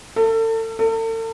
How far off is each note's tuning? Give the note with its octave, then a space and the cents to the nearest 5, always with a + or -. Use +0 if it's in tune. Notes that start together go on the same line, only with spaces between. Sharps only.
A4 +35
A4 +40